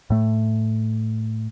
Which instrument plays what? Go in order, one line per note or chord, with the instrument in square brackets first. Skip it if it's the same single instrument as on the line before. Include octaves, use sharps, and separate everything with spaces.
[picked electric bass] A2 A3